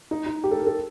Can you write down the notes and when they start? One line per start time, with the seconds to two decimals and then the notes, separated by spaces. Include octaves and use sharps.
0.11 D#4
0.26 D#4
0.44 G4
0.51 A4
0.59 A#4
0.67 A4